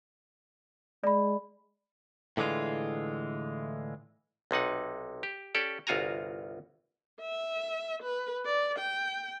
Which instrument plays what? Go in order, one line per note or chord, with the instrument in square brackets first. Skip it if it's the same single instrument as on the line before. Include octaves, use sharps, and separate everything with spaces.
[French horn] G#3 [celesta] D5 B5
[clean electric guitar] A2 D3 E3 G#3 F4
[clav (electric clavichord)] B1 C3 D#4 F#5
G4
C#4 G4 A4 D5
G1 C2 F4 F#4 G#5 A#5
[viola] E5
B4
D5
G5